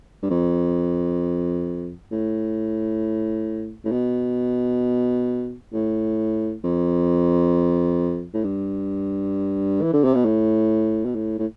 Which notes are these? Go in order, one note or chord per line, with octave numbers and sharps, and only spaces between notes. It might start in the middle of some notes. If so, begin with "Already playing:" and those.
G2
F2
A2
A2
B2
A2
F2
A2
G2
E3
D3
C3
B2
A2
B2
A2
A2